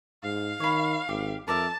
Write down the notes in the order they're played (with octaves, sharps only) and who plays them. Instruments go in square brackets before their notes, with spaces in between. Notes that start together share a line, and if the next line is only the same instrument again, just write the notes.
[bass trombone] G#2 [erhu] F5
[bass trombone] D#3 [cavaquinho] C#5 B5
[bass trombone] G#1 [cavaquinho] G4
[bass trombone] F2 [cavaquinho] A#4 D5 E5 [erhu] A5